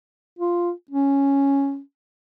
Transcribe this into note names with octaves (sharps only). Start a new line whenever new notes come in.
F4
C#4